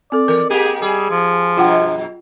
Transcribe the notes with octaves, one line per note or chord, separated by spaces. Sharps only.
C4 A4 D5
E3 A#4
G#3 A#3 G4 G#4
G3 G#4
F3
F#2 B2 F4 F#5 G5